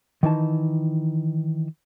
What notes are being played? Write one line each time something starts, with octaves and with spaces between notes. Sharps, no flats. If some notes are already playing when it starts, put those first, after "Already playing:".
D#3 E3 D#4 A5